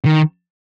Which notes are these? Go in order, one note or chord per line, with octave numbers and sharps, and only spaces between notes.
D#3